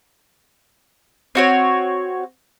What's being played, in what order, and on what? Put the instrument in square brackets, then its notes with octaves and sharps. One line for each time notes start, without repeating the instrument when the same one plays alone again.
[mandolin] C4 F#4 C#5